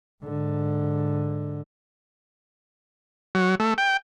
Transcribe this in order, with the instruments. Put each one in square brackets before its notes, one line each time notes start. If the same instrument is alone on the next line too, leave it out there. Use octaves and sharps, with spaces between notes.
[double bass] G#2 D3
[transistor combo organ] F#3
A3
G5